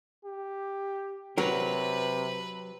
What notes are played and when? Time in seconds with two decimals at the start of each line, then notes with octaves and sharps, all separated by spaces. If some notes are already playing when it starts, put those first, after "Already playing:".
0.24 G4
1.38 C3 F#3 A#4 B4